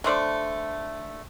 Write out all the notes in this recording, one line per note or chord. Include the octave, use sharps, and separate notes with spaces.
D3 A3 C5 D5